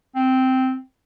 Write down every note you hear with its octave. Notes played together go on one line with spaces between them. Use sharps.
C4